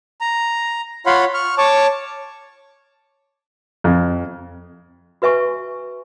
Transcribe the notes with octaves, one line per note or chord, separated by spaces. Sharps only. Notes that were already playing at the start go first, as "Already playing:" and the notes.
A#5
F4 C#5 F5 F#5 B5 C6
C#6 F6
C#5 A5 C#6 D6
F2
F#4 B4 E5 G#5 C#6